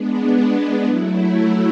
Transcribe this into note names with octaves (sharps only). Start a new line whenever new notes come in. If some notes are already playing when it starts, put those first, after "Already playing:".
Already playing: G#3 B3 D4
F#3 A3 E4